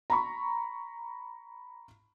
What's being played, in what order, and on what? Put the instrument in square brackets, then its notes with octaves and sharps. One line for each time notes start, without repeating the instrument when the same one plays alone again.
[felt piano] A#5 B5 C#6